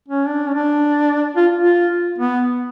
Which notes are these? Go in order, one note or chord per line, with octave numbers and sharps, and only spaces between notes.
C#4
D4
C#4
D4
F4
F4
B3